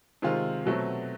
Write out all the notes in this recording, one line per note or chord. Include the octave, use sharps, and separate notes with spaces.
C3 D#3 G#3 C4 F4
B2 F#3 A3 C4